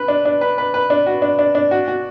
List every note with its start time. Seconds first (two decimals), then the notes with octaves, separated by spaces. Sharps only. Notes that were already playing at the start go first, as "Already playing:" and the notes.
Already playing: B4
0.08 D4
0.25 D4
0.41 B4
0.58 B4
0.74 B4
0.90 D4
1.06 F#4
1.22 D4
1.39 D4
1.55 D4
1.71 F#4
1.88 F#4